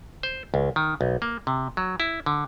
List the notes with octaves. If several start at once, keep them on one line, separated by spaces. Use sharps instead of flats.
C5
C#2
D#3
B1
A#3
C3
F#3
E4
D3